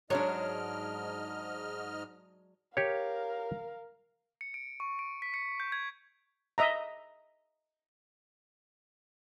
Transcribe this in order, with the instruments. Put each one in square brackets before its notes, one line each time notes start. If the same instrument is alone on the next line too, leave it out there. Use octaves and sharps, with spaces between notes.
[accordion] G#2 D#5 F6 [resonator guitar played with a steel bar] F#3 G#3 D4 [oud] C#5
[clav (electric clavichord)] G4 C#5 [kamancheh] A#4 F5
[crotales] C#7
D7
C#6
D7
B6
C#7
G6
G#6
[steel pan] D#5 E5 A#5